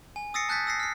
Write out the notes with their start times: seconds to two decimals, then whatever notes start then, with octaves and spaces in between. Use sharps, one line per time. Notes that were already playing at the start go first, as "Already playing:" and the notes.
0.16 G#5
0.34 D#6 E6 A6 A#6 C7 C#7
0.49 A5 F#6 G6 A6 B6
0.67 E6 A#6 C7
0.80 F6 C7